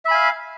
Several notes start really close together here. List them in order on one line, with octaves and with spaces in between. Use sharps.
E5 B5 G#5 F5